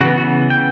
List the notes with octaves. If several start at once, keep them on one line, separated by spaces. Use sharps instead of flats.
C#3 E3 B3 F#4
F#4
G5